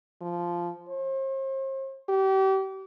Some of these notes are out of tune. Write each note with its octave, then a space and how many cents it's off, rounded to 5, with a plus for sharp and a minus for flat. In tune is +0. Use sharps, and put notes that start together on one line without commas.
F3 -10
C5 +40
G4 -35